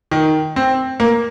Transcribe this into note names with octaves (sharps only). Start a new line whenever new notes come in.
D#3
C4
A#3